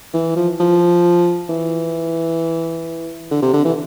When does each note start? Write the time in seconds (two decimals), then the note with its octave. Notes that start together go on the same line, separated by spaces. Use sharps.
0.13 E3
0.36 F3
0.60 F3
1.49 E3
3.31 D3
3.42 C3
3.53 D3
3.65 E3